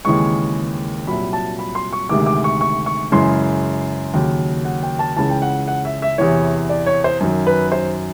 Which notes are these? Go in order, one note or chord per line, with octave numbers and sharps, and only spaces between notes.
D#2 C#3 E3 G#3 C#6
C2 A#2 F#3 B5
A5
B5
C6
C#6
D2 C3 D#3 G#3 D6
D6
C#6
C#6
C#6
F#2 C#3 E3 G#3 C6
D#2 C#3 F#3
F#5
G5
A5
C#2 C#3 E3 A5
G5
F#5
F#5
E5
E5
E2 C3 E3 C#5
D5
C#5
C5
F#2 D#3 F#3
B4
C5